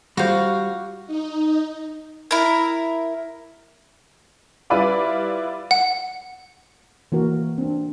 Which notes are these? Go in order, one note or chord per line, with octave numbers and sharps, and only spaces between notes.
G3 F4 F#4 C5 F5
D#4
E4 A#4
G3 E4 F4 B4 D5 F5
F#5
E3 A#3 F#4 A#4
C4 D4